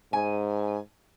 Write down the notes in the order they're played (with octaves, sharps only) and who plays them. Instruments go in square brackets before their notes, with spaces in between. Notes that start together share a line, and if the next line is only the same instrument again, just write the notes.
[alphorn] G#2 [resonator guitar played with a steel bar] G#5